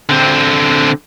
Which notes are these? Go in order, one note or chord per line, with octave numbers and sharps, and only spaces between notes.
D3 C4